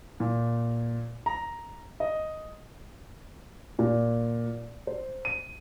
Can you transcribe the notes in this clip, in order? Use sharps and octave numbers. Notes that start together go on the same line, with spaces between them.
A#2
A#5
D#5
A#2
C5
D#7